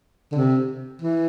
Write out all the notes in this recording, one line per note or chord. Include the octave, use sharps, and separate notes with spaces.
D3
C3
E3